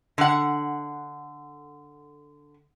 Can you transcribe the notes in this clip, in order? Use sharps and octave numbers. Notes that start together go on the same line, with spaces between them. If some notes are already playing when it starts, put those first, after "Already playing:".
D3 F#5